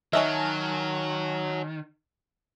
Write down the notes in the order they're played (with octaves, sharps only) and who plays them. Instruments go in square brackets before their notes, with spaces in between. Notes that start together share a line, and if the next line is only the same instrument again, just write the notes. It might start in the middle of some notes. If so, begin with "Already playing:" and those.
[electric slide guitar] D#3 [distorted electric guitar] F#3 [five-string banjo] C#5 D#5 E5 [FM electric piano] G#5 A5 F6